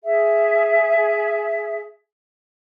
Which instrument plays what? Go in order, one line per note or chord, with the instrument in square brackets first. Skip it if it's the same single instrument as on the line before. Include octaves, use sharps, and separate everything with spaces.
[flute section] G#4 E5